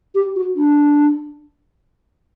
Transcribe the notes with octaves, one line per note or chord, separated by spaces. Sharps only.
G4
F#4
D4